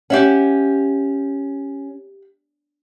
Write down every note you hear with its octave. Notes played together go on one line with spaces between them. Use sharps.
C#4 G4 E5 F#5